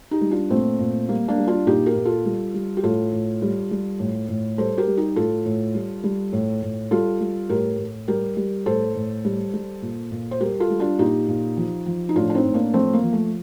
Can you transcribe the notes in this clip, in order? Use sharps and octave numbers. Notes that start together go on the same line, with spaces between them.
D#4 G4
G3
D4 F4
A#2 A3 C4
A#2
G3 A#3
A#3 D4
G3
D4 F4
A#2 D#4 G4
G4 A#4
A#2
F4 A4
G3
G3
G4
A2 F4 A4
A2
G3
G3
A2
A2
G3 A4 C5
G4 A#4
G3
D#4 G4
A2 F4 A4
A2
G3
G3
A2
A2
G3 F4 A4
G3
A2 G4 A#4
A2
G3 G4 A#4
G3
A2 A4 C5
A2
G3
G3
A#2
A#2
C5
G3 G4 A#4
F4 A4
G3
D4 F4
A#2 D#4 G4
A#2
F3
F3
D#4
A2 D4 F4
D4
C4 D#4
A2
A#3 D4
F3 A3 C4
A#3
F3
A3